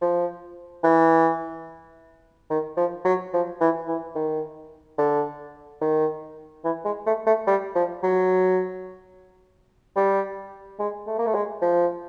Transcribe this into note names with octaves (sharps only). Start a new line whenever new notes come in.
F3
E3
D#3
F3
F#3
F3
E3
E3
D#3
D3
D#3
E3
G#3
A3
A3
G3
F3
F#3
G3
G#3
A3
A#3
A3
G#3
F3